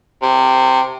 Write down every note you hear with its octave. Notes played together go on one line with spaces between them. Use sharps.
C3